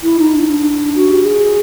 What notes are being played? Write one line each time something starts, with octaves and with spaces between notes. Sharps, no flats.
E4
D#4
D4
D4
F#4
G4
G#4